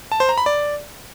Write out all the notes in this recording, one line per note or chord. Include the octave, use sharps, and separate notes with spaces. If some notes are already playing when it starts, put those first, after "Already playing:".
A5
C5
A#5
B5
D5